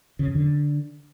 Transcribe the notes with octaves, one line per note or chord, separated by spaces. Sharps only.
C#3
F2
D3